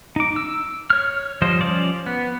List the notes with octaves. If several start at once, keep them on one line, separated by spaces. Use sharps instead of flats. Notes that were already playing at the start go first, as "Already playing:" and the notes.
D#4 D6
E6
C#5 F6
F3 G3 C5 D#5
F3 C#4 D5
B3